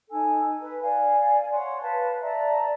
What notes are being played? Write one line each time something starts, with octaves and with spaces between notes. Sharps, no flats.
D#4 A4 G#5
B4
D5 F5 G#5
C#5 F#5 C6
B4 F5 A5
D5 E5 A5 A#5